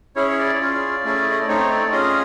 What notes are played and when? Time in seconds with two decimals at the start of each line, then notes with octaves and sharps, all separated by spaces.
0.16 C#4 E4 G#4 C#5
0.30 C#5
0.39 D5
0.60 C#4 F4 G#4
1.05 A3 C#4 E4 G#4
1.31 D#5
1.40 D5
1.48 A3 C4 D#4 C#5
1.70 D5
1.92 C#4 F4 G#4 D#5